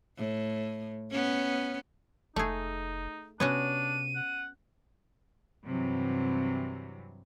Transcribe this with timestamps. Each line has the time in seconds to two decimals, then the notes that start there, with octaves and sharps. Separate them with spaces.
0.17 A2
1.10 B3 C#4
2.36 F1 A3 D#4 G#4
3.40 C3 B3 C#4 D4 F#4 D#7
4.15 F#5
5.64 G2 C3 E3 F#3